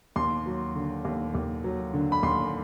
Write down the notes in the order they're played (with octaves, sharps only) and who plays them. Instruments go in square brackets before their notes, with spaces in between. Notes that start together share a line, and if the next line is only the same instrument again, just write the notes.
[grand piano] D#2 C6
F#3
D3
D#2
D#2
F#3
D3
B5
D#2 C6